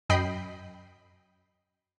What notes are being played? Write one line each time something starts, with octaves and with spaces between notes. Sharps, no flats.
F#2 D#5 G5 B5 C7